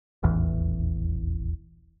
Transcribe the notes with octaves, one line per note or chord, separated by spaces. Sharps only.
D#1 A1 E2 E3